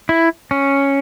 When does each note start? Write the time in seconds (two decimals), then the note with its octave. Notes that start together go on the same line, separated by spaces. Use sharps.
0.09 E4
0.51 C#4